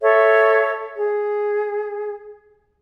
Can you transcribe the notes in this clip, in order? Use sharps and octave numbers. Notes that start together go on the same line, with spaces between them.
A4 C#5 E5
G#4